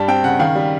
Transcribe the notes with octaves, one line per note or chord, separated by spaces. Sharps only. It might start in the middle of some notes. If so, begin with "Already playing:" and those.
Already playing: G2 G3 A5
C4 G5
C#3 F#5
D#3 F5
G3